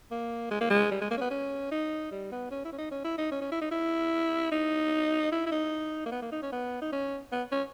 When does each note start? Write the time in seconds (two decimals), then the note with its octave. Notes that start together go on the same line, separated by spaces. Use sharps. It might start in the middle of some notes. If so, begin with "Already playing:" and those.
0.11 A#3
0.50 G#3
0.60 A#3
0.70 G#3
0.91 G3
1.01 G#3
1.11 A#3
1.17 C#4
1.21 B3
1.31 C#4
1.71 D#4
2.11 G3
2.32 B3
2.51 C#4
2.65 E4
2.72 C#4
2.78 D#4
2.91 C#4
3.05 E4
3.18 D#4
3.31 C#4
3.41 C#4
3.52 E4
3.61 D#4
3.71 E4
4.52 D#4
5.32 E4
5.46 E4
5.52 D#4
6.06 A#3
6.12 B3
6.22 A#3
6.32 D#4
6.42 C#4
6.52 B3
6.82 D#4
6.92 C#4
7.32 B3
7.52 C#4